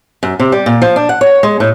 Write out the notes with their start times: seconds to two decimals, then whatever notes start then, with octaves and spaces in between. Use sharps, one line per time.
0.23 F#2
0.39 C3
0.52 G3
0.66 A#2
0.82 F3
0.96 D4
1.09 F#5
1.21 C#5
1.43 G#3
1.60 A2